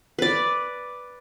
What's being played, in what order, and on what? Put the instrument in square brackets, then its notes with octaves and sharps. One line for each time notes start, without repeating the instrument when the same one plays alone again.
[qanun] B4 D5